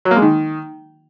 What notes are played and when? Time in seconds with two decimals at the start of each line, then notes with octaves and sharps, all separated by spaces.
0.05 F#3
0.11 A#3
0.17 G#3
0.22 D#3